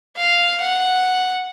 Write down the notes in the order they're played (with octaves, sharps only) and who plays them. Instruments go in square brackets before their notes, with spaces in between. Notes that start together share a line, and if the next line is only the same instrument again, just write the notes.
[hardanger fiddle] F5
F#5